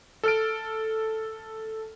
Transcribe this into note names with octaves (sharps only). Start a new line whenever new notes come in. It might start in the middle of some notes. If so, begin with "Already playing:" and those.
A4 F6 D7